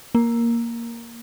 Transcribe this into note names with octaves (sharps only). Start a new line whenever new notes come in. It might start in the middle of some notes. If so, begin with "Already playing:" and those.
A#3